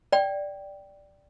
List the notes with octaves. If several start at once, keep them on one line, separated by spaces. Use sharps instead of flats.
D5 G5